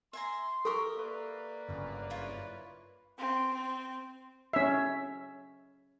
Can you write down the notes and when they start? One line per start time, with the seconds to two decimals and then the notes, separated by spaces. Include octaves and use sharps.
0.13 E5 G#5 A#5 C6
0.65 G4 A4 A#4 E5 C#6
0.97 A#3 B4 D5
1.69 G1 F#2 C#3
2.10 E4 F4 C#5
3.19 C4
3.54 C4
4.53 C#4 E5